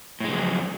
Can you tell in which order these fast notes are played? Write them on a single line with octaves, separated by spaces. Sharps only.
A2 G#3 C#3 F#3 F2